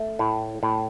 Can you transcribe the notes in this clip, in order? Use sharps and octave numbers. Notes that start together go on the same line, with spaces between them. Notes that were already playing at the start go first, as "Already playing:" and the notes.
Already playing: A3
A2
A2